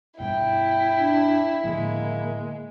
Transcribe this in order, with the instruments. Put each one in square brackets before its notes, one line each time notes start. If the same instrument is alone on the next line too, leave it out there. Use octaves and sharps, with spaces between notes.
[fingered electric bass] G2 B2 [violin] E4 [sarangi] G5
[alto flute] D4
[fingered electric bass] A2 D3 F3 [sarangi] G#3 [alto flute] A#3